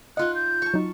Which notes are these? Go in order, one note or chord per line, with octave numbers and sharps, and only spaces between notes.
D#4 F4 D#5 F#5 F#6
G6
A5 C#6
F#3 D#4